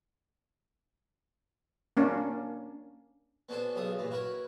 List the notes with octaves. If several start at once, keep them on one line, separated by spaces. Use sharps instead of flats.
A#3 C#4 D4
B3 C#4 D4 F#4 A4 C5
B1 C#3 F#3 F4 E5 D#6
G2 A#2 E3
E4 F#4 A#4 B4 C#5